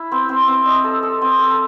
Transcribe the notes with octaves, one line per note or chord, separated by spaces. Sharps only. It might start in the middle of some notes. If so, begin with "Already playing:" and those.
Already playing: E4
C4
C4
C4
D#5
A4
A4
C4
A4